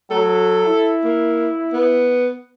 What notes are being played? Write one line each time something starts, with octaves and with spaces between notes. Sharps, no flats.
F#3 A4
E4
A#3
B3